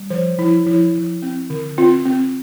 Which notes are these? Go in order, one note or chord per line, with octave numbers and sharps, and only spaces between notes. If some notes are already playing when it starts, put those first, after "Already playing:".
Already playing: G3
F3 C5
F3 E4
F3 E4
F3
C4
D3
C4 F4
C4